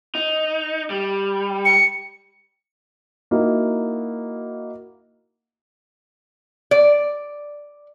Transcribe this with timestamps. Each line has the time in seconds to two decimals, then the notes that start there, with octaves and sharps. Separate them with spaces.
0.15 D#4
0.90 G3
1.65 C#7
3.31 A#3 D#4 E4 F#4
6.71 D5